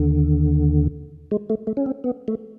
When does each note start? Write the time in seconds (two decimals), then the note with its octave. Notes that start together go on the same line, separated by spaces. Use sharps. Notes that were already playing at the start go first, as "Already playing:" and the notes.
Already playing: D#2 D3
1.31 G#3
1.50 A3
1.67 A3
1.77 C#4
1.86 C4
2.04 B3
2.28 A3